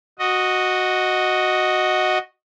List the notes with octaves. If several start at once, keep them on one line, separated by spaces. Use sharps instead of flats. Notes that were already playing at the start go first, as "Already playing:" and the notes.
F#4 D#5